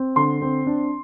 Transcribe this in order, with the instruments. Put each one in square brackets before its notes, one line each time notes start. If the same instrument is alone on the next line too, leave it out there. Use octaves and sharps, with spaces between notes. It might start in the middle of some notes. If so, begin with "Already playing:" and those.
Already playing: [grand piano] C4
D3 C6
C4
D4